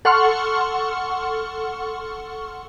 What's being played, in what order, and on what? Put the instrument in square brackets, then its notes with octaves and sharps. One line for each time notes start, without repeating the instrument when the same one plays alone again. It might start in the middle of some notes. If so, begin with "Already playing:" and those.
[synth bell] A4 F#5 C6 C#6 F6